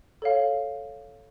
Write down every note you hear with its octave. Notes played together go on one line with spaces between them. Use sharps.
A4 C#5 F5